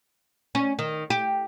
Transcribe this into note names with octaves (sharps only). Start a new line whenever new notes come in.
C#4
D#3
G4